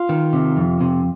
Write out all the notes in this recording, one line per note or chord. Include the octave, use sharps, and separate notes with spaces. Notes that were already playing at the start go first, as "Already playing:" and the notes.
Already playing: F4
D#3
C3
F2
C3